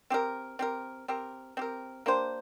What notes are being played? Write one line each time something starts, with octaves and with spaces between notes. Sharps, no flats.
C4 G4 A#4
C4 G4 A#4
C4 G4 A#4
C4 G4 A#4
A#3 D4 G4 C5